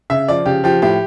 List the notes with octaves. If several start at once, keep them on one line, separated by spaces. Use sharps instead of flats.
C#3 E5
F3 D5
C#3 G4
F3 G4
A2 G4